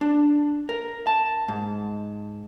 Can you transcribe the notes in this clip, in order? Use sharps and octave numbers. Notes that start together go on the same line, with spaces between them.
D4
A#4
A5
G#2